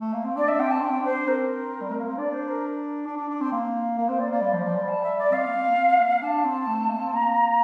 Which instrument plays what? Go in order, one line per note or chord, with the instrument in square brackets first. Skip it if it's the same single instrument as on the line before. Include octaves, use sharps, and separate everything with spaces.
[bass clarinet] A3
A#3
C4
[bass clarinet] D4 [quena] D5
[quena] E5
[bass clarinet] C4 [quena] G5
[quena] A5
[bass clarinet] D4 [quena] G5
[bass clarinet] C4
[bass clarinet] D4 [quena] C5
[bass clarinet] C4 [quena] A#4
[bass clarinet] G3
A3
A#3
C4
[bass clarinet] D4 [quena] D5
[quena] C5
A#4
[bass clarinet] D4
D4
D4
C4
A#3
[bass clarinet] A#3 [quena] A#4
[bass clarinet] C4 [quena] C5
[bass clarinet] A#3 [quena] D5
[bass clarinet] A#3 [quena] D5
[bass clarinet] G3
F3
F3
G3
[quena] A5
E5
D5
[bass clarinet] C4 [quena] F5
[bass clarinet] A#3
C4
A#3
C4
A#3
[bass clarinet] D4 [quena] A5
[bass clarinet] C4
A3
A#3
C4
[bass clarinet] A#3 [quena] A#5